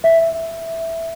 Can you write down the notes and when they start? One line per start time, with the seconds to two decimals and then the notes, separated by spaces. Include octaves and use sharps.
0.04 E5